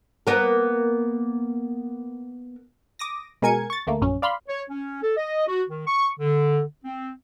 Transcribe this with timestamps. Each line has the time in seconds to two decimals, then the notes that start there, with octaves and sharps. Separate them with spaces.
0.27 A#3 B3 A#4
2.99 D6 D#6 A#6
3.42 B2 G#3 A#4 G#5 G#6 C#7
3.70 C#6 A6
3.87 D2 A3 A#3
4.01 A#1 F#2 C#4
4.22 D5 F5 B5 C6
4.47 C#5
4.70 C#4
5.02 A4
5.17 D#5
5.48 F#4
5.70 D#3
5.87 C#6
6.20 D3
6.85 C4